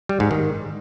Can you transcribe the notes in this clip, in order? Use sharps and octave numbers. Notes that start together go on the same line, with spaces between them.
G3
G#2
D#3